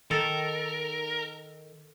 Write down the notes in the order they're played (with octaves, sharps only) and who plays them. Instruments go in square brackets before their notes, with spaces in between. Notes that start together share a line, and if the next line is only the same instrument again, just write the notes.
[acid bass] D#3 [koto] A4 [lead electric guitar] A#4